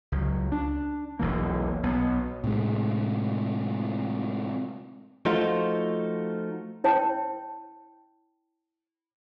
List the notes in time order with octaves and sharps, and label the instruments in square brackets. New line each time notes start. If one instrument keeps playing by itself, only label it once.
[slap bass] C#2 F#3
D4
E1 B1 E3 A#3
B1 B3
[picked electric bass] A2 C3 G#3
[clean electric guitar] F3 A3 D#4 F4 F#4 C5
[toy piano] E4 C#5 G5 A5